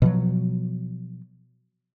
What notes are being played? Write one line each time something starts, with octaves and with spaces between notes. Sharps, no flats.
B2 F3 F#3